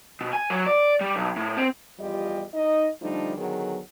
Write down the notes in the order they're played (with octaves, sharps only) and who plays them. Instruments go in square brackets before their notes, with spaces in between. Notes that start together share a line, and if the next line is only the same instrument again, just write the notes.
[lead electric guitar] B2
G#5
F#3
D5
G3
B1
A2
C4
[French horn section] E2 F3 G3 F4 G4 D#5
D#4 D#5
D3 F3 G3 A3 D4 D#4
D3 D#3 F#3 B3 G#4